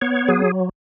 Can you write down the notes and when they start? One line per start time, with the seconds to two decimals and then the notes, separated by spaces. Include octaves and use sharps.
0.01 B3 C#5
0.28 F#3 G#4